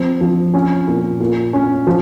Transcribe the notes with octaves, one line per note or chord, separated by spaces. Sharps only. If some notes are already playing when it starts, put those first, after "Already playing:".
Already playing: F3 C4
F3
C#4
A#2
A#2
C#4
F3